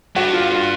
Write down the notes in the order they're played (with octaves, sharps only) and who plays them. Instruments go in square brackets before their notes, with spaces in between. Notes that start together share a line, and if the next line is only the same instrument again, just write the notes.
[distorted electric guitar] G2 [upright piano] F#4
[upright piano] F4
F4